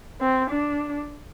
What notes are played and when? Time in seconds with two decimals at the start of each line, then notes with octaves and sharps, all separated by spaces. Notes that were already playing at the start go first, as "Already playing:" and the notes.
0.20 C4
0.50 D4